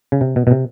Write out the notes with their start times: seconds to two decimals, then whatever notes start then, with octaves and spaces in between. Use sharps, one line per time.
0.12 C#3
0.21 C3
0.36 B2
0.47 B2
0.51 C3